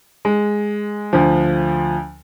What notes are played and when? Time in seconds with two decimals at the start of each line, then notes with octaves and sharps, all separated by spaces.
0.25 G#3
1.13 D2 F3